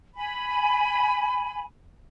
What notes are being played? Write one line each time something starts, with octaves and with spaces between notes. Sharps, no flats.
G#5 B5